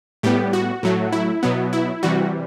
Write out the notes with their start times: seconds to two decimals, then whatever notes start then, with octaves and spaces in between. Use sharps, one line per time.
0.23 A2 G3 B3 G4
0.53 F#4
0.83 A2 F#3 A3
1.12 E4
1.43 B2 F#3 B3
1.73 E4
2.03 C3 E3 G3 F#4